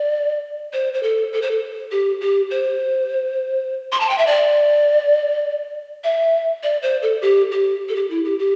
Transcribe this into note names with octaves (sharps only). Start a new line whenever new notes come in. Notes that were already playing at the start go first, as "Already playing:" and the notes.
Already playing: D5
C5
C5
A4
A4
C5
A4
G4
G4
C5
C6
A5
G5
E5
D5
E5
D5
C5
A4
G4
G4
A4
G4
E4
G4
G4